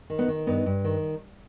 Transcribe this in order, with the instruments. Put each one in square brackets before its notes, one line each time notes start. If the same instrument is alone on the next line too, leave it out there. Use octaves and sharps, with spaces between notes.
[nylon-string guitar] D#3
B3 D#4
D#3
G2 B3 D#4
G2
D#3